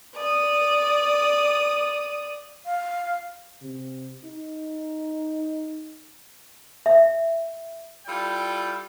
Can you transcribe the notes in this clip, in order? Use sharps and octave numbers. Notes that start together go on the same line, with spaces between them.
D5 D#6
F5
C3
D#4
E5
G3 E4 F4 A4 D5 G5